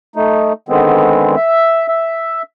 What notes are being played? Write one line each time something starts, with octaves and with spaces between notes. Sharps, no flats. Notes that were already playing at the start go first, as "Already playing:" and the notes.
A3 D#4
D3 D#3 G#3 B3 C4
E5
E5